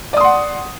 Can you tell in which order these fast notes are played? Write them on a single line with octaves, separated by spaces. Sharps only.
D5 D#6 C6 F#5